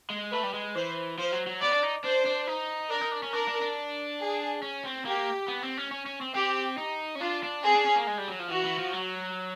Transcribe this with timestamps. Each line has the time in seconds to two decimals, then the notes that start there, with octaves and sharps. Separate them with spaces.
0.10 G#3
0.32 A3 B4
0.44 G3
0.54 G#3
0.75 E3 C5
1.18 F3 C5
1.32 F#3
1.47 F#3
1.62 B3 D5
1.72 D4
1.83 D#4
2.04 D4 C5
2.26 D4
2.47 D#4
2.90 D4 A#4
3.01 D#4
3.12 D4
3.23 C#4
3.33 D4 A#4
3.48 D4
3.62 D4
4.20 G#4
4.62 C#4
4.85 C4
5.05 A#3 G4
5.48 B3
5.63 C4
5.77 C#4
5.91 C#4
6.06 C#4
6.21 C4
6.35 C4 G4
6.78 D#4
7.15 C#4
7.21 D4 F4
7.43 D4
7.64 C4 G#4
7.75 D4
7.86 C#4
7.96 A#3
8.07 G#3
8.18 G3
8.28 F#3
8.39 F3
8.50 E3 F#4
8.65 E3
8.79 F3
8.93 F#3